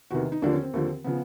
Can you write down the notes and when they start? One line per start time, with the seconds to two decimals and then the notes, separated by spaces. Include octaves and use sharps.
0.11 E2 C3 D#3 F#4
0.32 D#4
0.42 D#2 D3 F3 D4
0.53 C#4
0.62 C4
0.74 D#2 D3 F3
1.04 C#3 F3 B3